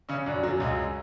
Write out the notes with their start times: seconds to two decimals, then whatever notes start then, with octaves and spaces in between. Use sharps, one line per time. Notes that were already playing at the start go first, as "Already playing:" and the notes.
0.09 C#3 C#4
0.26 F#2 D3 D4
0.44 F#2 F#3
0.60 C#2 G#3
0.78 G#3